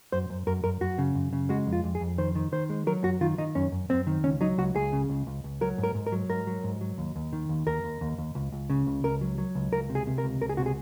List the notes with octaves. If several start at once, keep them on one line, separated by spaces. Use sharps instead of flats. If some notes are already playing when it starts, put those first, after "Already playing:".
F#2 C5
F#2
F#2 A#4
F#2 A#4
F#2 F#4
C#3
F#2
C#3
G#3 F#4
F2
F4
F2
G#4
F2
D#3 C5
D#3
D#3 C5
G#3
F#3 A#4
F#2 F#4
D#3 F4
D#3 D#4
F#2 C#4
F#2
F#2 C4
D#3
C#2 C#4
F#3 D#4
C#2 F#4
C#2 G#4
C#3
C#2
C#2
C#2
F#3 A#4
G#2
A#4
G#2
A#4
F#3
G#2 A#4
F#3
G#2
F#3
D#2
D#2
D#3
D#2
D#2 A#4
D#2
D#2
D#2
C#2
C#2
C#3
C#2
C#2 A#4
F#3
F#3
C#2
C#2 A#4
C3
G#4
C3
A#4
C#2
C#2 A#4
G#4
C3 F#4
G#4